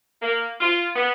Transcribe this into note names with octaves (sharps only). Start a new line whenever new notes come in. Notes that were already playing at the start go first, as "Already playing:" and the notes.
A#3
F4
B3